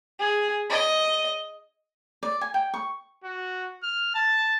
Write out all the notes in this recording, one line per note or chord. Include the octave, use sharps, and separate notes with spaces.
G#4
D#5
D5
G#5
G5
C#6
F#4
F6
A5